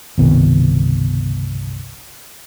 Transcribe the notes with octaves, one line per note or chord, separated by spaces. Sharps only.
G1 C2 B2 D#3